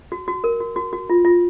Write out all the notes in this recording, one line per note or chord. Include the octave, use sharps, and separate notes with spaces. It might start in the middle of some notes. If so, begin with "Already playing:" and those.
F#4
F#4
A#4
F#4
F#4
F#4
F4
F4